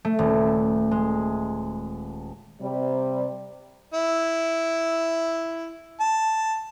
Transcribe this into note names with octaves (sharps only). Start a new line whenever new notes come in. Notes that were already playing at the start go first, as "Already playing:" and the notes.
A3
D#1
G#3
C3 G3
E4
A5